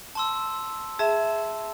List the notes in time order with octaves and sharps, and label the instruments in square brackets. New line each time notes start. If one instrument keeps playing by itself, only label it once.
[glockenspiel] A5 C6 E6
[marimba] G#4 E5 [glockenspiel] A5